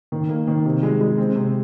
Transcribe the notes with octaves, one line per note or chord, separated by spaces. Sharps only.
D#3
A#3
D#3
C3
G#3
G#3
C4
C3